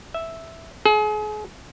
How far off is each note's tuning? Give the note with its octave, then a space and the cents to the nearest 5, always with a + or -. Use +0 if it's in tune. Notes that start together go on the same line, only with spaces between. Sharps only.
E5 -5
G#4 +35